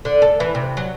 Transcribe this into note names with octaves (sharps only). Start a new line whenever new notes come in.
D3
A4
E3
C3
F#3